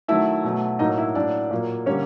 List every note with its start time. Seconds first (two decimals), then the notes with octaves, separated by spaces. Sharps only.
0.08 D#3 F#3 A3 E4 E5
0.44 B2 F#3 A3
0.79 A2 F#3 A#3 D#4 D#5
0.98 E4 E5
1.15 A2 F#3 A#3 D4 D5
1.51 A#2 F#3 A#3
1.86 D3 G3 A#3 C#4 C#5